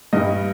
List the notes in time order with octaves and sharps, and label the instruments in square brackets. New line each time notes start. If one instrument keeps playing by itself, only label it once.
[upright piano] G2 G3 D#5